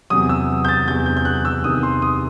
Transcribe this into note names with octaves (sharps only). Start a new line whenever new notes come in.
E2 C3 F#3 D#6
E6
G6
A6
E2 C3 F#3 G6
G6
G6
F#6
E6
E2 C3 D#3 D#6
C6
D#6